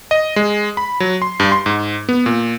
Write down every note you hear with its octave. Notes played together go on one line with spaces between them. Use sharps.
D#5
G#3
B5
F#3
C6
G2
C6
G#2
B3
A#2